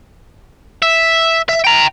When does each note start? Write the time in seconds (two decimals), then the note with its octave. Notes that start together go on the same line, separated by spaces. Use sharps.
0.82 E5
1.49 E5
1.64 G5 A#5